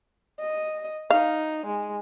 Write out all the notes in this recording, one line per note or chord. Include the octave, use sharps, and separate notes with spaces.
D#5
D#4 F5
G#3